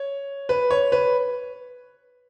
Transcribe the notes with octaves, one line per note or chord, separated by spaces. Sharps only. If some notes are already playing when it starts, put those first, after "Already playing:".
Already playing: C#5
B4
C#5
B4